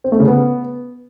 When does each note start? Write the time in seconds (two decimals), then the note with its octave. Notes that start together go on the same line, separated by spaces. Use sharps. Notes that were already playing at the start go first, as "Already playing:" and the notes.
0.04 C4
0.12 A3
0.20 C#3
0.27 B3